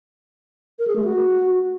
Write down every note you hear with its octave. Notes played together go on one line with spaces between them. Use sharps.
A#4
G#4
A3
F#4